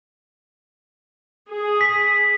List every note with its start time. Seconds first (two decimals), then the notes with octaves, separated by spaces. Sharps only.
1.49 G#4
1.81 B6